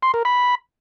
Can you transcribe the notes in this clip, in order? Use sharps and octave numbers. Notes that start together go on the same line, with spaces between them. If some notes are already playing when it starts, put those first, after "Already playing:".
C6
A#4
B5